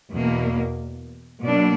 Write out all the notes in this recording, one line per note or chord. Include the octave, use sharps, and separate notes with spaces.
E2 B2 A#3
B2 F#3 A#3 D4